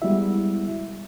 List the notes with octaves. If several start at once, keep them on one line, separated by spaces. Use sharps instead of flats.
G3 G#3 B3 E4 F#4 E5